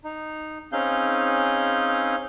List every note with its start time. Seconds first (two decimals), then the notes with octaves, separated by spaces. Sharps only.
0.04 D#4
0.72 C4 C#4 D#4 G#4 F5 G6